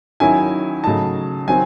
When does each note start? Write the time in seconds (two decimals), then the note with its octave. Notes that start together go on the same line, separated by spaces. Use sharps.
0.20 D#3 F#3 C#4 E4 G#5
0.84 C#3 F#3 A3 D#4 A5
1.48 D#3 F#3 C4 G#5